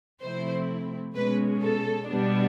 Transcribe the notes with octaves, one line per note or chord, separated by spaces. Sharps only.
C3 F3 A3 C4 E4 C5
B2 G#3 C#4 B4
A4
B2 G3 B3 D4